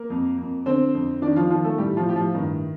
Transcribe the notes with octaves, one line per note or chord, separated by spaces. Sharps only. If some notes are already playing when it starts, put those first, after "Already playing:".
Already playing: A#3 A#4
F2
F2
D3 C4 C5
F2
D#3 D4 D5
F3 F4
D#3 F3 F4
A3 A4
A2 G3 G4
F3 F4
A2 G4
F3 F4
G2 D#3 D#4